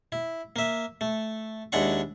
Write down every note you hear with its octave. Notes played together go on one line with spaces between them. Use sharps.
E4
A#3 E5
A3
D#2 G#3 D4 E4 F#5 C#6